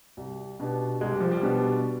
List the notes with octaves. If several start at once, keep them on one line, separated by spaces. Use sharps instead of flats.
C2
B2 B3 D4 G4
C2 G#3
G3
F3
G3
B2 B3 D4 G4